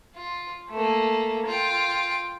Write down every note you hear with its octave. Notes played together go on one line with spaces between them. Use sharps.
F4
A3 A#3
F4 G5